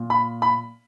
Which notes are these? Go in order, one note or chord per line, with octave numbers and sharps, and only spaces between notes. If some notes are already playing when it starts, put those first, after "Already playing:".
Already playing: A#2
B5
B5